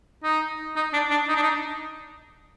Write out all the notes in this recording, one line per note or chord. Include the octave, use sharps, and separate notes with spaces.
D#4
D#4
D4
D4
D#4
D4
D#4